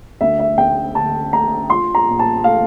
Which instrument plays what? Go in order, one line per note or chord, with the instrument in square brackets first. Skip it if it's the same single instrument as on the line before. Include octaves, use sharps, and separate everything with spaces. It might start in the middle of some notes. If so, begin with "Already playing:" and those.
[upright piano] D2 E5
E5
D2 G5
D3 A5
A3 A#5
F4 C6
A#5
A#2
A5
A3 F5